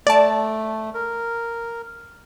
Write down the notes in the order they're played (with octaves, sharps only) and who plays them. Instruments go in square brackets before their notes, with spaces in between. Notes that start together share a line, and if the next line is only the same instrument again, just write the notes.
[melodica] A3 [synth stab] D5 A5
[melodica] A#4